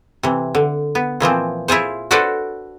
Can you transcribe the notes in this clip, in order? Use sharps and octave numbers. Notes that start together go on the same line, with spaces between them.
C3 E3
D3
B3
A#2 E3 F3 C4
E4 F4 G#4 C5
D4 F#4 A4 B4 C5 D5